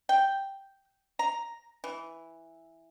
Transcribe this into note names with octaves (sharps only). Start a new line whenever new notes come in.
G5
A#5
E3